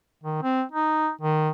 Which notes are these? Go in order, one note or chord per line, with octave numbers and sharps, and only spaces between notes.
D#3
C4
D#4
D#3